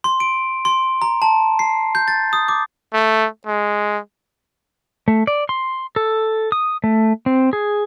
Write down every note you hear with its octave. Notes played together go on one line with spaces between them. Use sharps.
C6
D7
C6
A#5
A5
C7
G6
A6
D#6
D6
A3
G#3
A3
D5
C6
A4
D#6
A3
C4
G#4